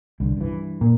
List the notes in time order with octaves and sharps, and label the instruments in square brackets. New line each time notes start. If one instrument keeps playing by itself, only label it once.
[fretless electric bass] C2 D3
G2 E3
[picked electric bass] A#2